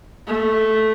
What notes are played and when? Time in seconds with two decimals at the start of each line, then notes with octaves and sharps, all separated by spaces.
0.27 A3